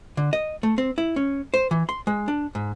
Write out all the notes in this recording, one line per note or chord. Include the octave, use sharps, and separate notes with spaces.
D3
D#5
A3
C4
E4
C#4
C5
E3
C6
G#3
D4
G#2